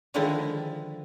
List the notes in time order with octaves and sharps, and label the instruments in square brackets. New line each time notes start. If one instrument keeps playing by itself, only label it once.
[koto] D3 D#3 F3 G#3 D#4 E4